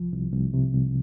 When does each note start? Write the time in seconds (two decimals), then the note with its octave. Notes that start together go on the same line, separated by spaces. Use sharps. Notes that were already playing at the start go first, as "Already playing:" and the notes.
Already playing: C2 F3
0.12 C2
0.33 C2
0.53 C3
0.74 C2